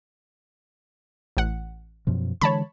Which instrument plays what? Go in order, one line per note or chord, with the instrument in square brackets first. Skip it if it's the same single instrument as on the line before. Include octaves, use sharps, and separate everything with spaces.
[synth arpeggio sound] A1 F#5
[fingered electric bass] F#2 B2 F3
[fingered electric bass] D3 E3 G#3 [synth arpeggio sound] C#5 A5 B5